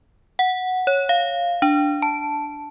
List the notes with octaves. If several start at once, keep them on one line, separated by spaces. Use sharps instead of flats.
F#5
C#5
F5
D4
A5